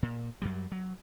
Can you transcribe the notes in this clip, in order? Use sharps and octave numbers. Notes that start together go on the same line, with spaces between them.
A#2
F#2 F#3 G3
F#3